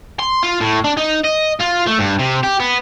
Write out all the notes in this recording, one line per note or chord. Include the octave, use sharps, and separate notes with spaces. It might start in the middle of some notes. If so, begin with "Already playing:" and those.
C6
F4
A2
D4
D#4
D#5
F4
A3
G2
C3
G4
B3